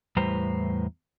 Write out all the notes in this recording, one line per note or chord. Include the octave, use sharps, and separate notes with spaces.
E2 A2 G3 B4 C5 A#5